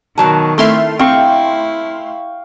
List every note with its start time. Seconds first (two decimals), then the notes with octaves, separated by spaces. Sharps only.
0.18 B2 D#3 F#3 A5
0.58 A3 C4 E4 E5 C6 F6
0.99 C4 E4 F5 G5 C#6